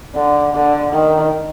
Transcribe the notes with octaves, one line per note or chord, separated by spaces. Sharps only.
D3
D3
D#3